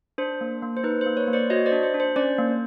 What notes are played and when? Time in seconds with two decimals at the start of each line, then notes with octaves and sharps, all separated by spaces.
0.18 D4 C5
0.41 A#3
0.62 A#3
0.77 C5
0.84 D#4 B4
1.01 C5
1.06 A#3
1.17 B4 C#5
1.28 A#3
1.33 C5 D5
1.50 F#4 C#5 D#5
1.66 C5 D5
1.72 D4
1.83 C5
1.94 D4
2.00 C5
2.16 C#4 C5 D5
2.38 A#3